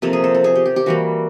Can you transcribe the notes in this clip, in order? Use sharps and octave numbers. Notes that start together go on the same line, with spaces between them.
C3 F3 A#3 A4
G#4
A4
A4
G#4
G4
G4
G4
E3 G3 A#3 F#4